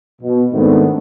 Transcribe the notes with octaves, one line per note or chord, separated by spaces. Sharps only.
B2
G#2 D#3 A3 B3 C4 D4